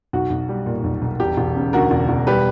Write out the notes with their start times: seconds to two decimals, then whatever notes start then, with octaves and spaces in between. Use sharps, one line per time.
0.13 B1 F#4
0.30 B1
0.49 G3
0.66 A#2
0.84 B1
1.02 B1
1.20 E1 G4
1.37 E1
1.56 C#3
1.73 D2 F#4 A#4
1.91 E1
2.09 E1
2.27 G3 G4 B4